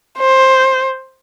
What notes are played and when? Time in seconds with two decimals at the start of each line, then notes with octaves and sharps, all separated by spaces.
0.19 C5